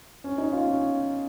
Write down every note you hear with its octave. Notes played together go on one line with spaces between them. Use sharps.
C#4
D#4
F4
C#4